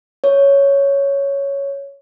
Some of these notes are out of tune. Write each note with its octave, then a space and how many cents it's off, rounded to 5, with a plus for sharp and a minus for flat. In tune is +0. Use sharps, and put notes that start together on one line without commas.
C#5 +5